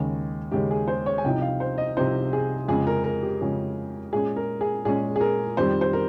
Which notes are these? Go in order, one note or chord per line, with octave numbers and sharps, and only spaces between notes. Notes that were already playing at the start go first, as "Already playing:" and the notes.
Already playing: D#2 C#3 G#3 C#4
D#2 C#3 G#3 C#4 G4
G#4
C5
C#5
G#5
C2 C3 F3 C4 D#4 G5
F5
C5
D#5
C2 C3 F3 C4 D#4 C5
G#4
F2 C#3 G#3 C#4 G#4
A#4
A#4
G4
F2 C#3 G#3 C#4
A#2 G#3 C#4 G#4
A#4
G#4
A#2 G#3 C#4 G#4
G#4
A#4
F2 D#3 G3 C4 C5
C5
A#4